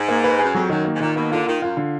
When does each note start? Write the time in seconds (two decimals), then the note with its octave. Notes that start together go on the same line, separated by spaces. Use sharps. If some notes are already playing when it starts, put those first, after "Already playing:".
Already playing: G#2
0.09 A#3
0.24 B4
0.39 F#2 G#4
0.55 F2 F#3
0.70 F#2 D#3
0.85 A#3
0.94 G#2
1.00 A#2 D#3
1.16 B2 A#3
1.31 D3 F4
1.47 D#3 F4
1.62 F#2 F4
1.77 D3